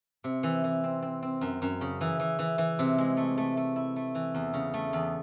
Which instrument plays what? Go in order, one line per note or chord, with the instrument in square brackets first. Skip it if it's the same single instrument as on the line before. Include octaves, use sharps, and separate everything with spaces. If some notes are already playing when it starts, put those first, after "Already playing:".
[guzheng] C3
E3
E3
C4
C4
C4
F#2
F#2
C#3
E3
E3
E3
E3
C3
G#3
A3
A3
A3
E4
A3
E3
E2
C#3
A3
E2